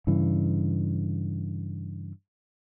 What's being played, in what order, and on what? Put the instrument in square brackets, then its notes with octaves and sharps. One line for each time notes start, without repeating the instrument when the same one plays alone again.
[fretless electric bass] G2 C#3 E3